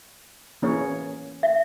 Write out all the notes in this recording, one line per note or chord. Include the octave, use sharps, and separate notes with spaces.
E3 A#3 C#4 G#4 C#5
E5